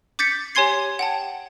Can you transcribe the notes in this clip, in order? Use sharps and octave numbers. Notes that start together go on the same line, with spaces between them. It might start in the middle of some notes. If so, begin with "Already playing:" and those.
D6 G6 A6 B6 C#7
G4 C#5 G#5 C6 G#6 C7
F#5 G5 A5